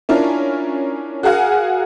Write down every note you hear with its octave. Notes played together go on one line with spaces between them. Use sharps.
C#4 D4 E4 F4 A#4
F#4 G#4 A#4 F5 F#5 G#5